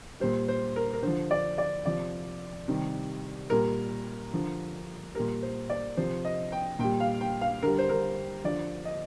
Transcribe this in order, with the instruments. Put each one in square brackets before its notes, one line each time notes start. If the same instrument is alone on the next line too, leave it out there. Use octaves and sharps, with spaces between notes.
[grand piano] A#2 G3 C5
C5
A#4
A#4
D3 F3 C5
D5
D5
C3 F3 D5
C3 D#3 G3
A#2 G3 A#4
D3 F3
A#2 G3 A#4
C5
D5
C3 F3 C5
D#5
G5
A#2 G3 G5
F5
G5
F5
D3 G3 A#4
C5
A#4
D3 F3 D5
D#5